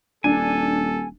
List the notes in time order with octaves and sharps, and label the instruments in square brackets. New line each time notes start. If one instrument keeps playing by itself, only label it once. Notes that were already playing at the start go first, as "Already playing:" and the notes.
[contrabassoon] D#1 [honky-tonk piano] D4 [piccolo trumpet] A4 [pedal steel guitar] G#5